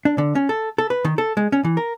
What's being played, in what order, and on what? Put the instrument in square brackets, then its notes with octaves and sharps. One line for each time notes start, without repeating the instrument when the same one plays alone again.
[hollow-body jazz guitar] D4
D3
C#4
A4
A4
B4
D#3
A4
G#3
C#4
E3
A#4